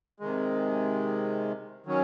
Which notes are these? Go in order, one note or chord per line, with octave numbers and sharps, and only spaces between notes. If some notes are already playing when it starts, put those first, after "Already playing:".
C3 D#3 G#3
D#3 F#3 C#4